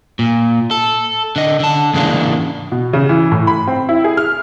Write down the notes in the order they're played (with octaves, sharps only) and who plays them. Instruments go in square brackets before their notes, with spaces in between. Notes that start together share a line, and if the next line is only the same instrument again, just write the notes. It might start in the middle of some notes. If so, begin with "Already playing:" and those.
[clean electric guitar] A#2
A4
D3 D#5
D3 A5
G#2 C#3 E3 G#3 A#3 D4
[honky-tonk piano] B2
C#3
E3
A2
B5
C4
E4
G#4
F6